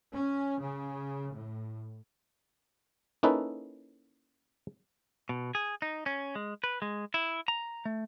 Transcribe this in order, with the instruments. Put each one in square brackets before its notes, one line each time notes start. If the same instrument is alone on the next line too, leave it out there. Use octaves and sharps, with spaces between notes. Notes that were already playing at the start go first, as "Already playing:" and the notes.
[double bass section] C#4
C#3
A2
[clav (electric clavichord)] A#3 C#4 D#4 E4 A4 B4
[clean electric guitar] B2
G#4
D#4
C#4
G#3
B4
G#3
E4
A#5
A3